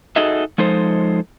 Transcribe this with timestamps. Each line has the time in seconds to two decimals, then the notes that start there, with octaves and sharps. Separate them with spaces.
0.16 D#4 F#4 G#4 A4 D#5 E5
0.58 F3 G#3 D#4 A4 C5